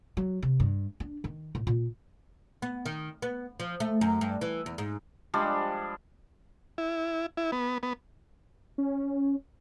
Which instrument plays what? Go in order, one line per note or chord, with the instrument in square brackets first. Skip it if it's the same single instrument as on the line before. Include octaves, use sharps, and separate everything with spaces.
[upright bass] F#3
C3
G2
D4
D#3
A2
A#2
[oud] B3
D#3
B3
F3
A3
F#2
G2
E3
E2
G#2
[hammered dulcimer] F3 G3 G#3 D4
[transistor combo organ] E4
E4
B3
B3
[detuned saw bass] C#4